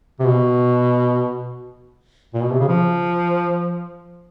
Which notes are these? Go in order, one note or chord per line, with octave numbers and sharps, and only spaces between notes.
C3
B2
A#2
B2
C3
C#3
F3